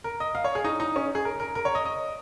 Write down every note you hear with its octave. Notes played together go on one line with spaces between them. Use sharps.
A#4
D#5
F5
C#5
G#4
D#4
D#4
C#4
G#4
A#4
A#4
A#4
C#5
D#5
D#5